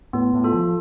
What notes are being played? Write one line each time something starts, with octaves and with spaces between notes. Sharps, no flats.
A2 B3
A2
F4 A4
F3